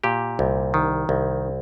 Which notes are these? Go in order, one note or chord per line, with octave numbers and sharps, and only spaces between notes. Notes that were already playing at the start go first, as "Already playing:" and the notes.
A#2 G4
C2
D#3
C2